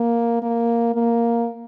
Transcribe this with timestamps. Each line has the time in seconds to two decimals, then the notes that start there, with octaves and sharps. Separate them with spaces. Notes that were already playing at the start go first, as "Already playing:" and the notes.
Already playing: A#3
0.42 A#3
0.95 A#3